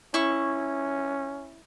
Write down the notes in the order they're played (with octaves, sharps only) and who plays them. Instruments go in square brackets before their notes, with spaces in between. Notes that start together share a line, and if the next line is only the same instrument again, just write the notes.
[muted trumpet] C#4 [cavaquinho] E4 C#6